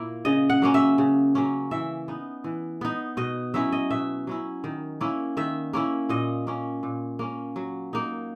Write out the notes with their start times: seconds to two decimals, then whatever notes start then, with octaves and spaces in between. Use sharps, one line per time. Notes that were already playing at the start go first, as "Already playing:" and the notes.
Already playing: A#2 A#3 E4
0.25 C#3 D#5
0.50 F#5
0.62 F#3 A#3 C#4
0.74 E5
0.98 C#3
1.35 F#3 A#3 C#4
1.71 E3 E5
2.08 B3 D#4
2.44 E3
2.81 B3 D#4
3.17 B2 D#5
3.54 F#3 C#4 E4 E5
3.72 D#5
3.90 B2 E5
4.27 F#3 C#4 E4
4.64 D#3
5.01 A#3 C#4 E4
5.37 D#3 E5
5.73 A#3 C#4 E4
6.09 A#2 D#5
6.47 A#3 C#4
6.83 A#2
7.19 A#3 C#4
7.56 F#3
7.93 A#3 D#4